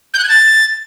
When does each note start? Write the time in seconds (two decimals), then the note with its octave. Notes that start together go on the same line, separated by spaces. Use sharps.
0.14 G6
0.19 F#6
0.24 G#6
0.29 A6